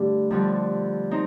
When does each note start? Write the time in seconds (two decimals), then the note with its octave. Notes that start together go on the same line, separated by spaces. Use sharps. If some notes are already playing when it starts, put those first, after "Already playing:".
Already playing: G2 D3 A3 D4 G4
0.30 F2 D3 G3
1.11 C4 D#4